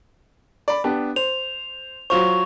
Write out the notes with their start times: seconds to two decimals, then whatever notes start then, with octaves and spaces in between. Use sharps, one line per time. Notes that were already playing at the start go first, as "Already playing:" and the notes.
0.68 D5 B5
0.84 B3 D4 G4
1.16 C5 F7
2.10 F#3 F4 C5 C#6 F7